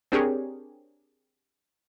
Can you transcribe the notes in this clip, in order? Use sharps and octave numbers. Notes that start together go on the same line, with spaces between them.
C4 D4 G4 G#4 A#4 C#5